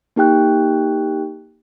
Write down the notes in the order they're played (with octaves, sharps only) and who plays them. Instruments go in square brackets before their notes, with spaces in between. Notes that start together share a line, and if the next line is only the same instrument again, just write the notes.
[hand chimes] A#3 D#4 G4 G5 F#6